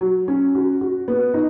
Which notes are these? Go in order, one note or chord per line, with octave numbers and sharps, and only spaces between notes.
F#3
C#4
F#4
F#4
B3
D#4